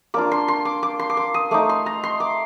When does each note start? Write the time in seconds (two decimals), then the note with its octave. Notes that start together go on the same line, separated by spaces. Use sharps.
0.14 A#3 D4 F4 D6
0.31 C6
0.48 C6
0.65 D6
0.83 D6
0.99 C6
1.10 D6
1.17 C6
1.34 D#6
1.51 A3 D#4 D6
1.69 C6
1.86 A#5
2.03 C6
2.20 D6